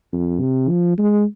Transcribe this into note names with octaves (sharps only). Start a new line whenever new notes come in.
F2
C3
F3
G#3